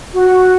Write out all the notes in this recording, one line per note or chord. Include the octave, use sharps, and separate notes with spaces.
F#4